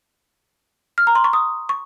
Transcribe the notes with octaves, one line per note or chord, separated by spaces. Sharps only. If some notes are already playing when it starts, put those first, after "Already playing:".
F6
A#5
C6
C#6
D#6
C#6